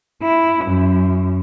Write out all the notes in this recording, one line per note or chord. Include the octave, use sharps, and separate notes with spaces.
E4
F#2